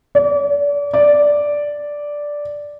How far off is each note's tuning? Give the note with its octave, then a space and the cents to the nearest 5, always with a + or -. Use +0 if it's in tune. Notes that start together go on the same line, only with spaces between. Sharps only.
D5 -35
D5 -5